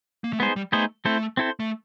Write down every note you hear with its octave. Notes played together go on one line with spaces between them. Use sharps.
A#3
A3
G#3 B3 D#4 G#4 C5
G3
A3 B3 D#4 G#4 C5
A3 C4 E4 A4 C5
C4 E4 A4 C5
A3